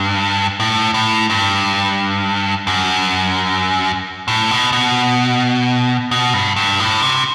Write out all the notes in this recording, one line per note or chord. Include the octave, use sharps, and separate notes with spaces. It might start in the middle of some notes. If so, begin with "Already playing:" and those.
Already playing: G2
A2
A2
G2
F#2
A2
B2
B2
B2
G2
G2
A2
C3